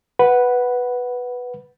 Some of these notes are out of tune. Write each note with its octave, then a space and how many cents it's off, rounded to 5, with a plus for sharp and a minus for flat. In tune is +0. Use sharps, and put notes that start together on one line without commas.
B4 +0 F#5 +0 B5 -10